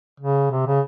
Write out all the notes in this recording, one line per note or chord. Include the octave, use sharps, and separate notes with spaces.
C#3
C3
C#3